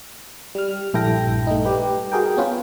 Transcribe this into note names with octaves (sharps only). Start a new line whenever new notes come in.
G3 F6
A#1 G2 E4 A4 G5 A#6
A3 D#4
G3 G4 B4
F#4 G#4 A#4 G5
B3 C#4 F4 B4